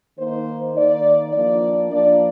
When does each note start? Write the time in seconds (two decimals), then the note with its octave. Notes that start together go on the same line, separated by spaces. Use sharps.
0.19 D#3 A#3 D#4 C5
0.76 D#3 A#3 D#4 D5
1.34 F3 A#3 D4 D5
1.92 F3 A#3 D4 D5